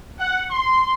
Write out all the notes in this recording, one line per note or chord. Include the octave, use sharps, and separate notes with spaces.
F#5
C6